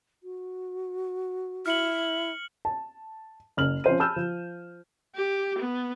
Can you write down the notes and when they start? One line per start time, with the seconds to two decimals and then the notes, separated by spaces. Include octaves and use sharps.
0.23 F#4
1.66 E4 F6 C#7 F#7
2.65 A5
3.57 F#1 F6 F#7
3.84 F3 C4 C#4 C5 C#5 D#7
4.00 A5 B5 E6 F6 G6 E7
4.16 F3
5.15 G4
5.58 B3